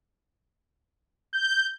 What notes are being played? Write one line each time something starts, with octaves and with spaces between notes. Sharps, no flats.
G6